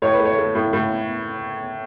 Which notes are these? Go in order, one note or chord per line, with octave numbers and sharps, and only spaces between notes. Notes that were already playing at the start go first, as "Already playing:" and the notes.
A2 C#5
B4
A3
C#5
A3
A2
A2